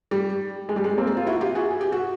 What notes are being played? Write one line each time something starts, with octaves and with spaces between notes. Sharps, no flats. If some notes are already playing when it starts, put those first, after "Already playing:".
G3
G#3
G3
G#3
A#3 C4
F4
E4 F#4
F4 G4
F#4 G#4
G#4
G4
F#4